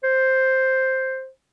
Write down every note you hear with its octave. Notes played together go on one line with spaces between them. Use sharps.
C5